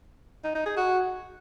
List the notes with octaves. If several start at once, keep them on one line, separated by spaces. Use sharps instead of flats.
D#4
D#4
G#4
F#4